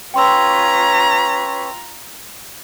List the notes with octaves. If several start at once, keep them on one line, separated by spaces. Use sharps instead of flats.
C#4 F4 B4 G5 A#5 C6 C#6 E6